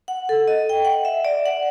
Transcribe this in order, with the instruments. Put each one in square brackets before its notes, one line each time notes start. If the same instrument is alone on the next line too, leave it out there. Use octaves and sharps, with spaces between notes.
[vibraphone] F#5
A4
D#5
G5
F#5
E5
D5
F#5